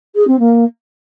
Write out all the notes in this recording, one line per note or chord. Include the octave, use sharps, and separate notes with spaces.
G#4
C4
A#3